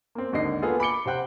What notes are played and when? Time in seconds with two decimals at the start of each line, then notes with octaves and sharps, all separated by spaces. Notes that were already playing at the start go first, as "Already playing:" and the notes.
0.15 A#3 C4
0.32 G#1 D#2 D3 D#5 C7
0.62 A#3 B3 F4 G#4 A4
0.80 B5 D6 C#7 G7
1.06 C3 C5 F#5 G5 F#6